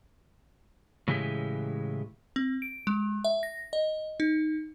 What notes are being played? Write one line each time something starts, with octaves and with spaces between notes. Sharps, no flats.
A2 C#3 E3 G#3 G4
C4
D7
G#3
E5
A#6
D#5
D#4